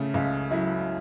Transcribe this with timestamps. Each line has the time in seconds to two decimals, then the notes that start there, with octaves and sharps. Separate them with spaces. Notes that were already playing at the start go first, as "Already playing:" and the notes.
Already playing: C#3 A3
0.14 C#2
0.51 F#3 E4